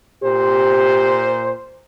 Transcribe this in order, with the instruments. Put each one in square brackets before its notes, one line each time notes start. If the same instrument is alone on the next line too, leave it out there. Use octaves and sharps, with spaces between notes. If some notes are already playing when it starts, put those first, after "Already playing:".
[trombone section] A#2 C5 [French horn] G4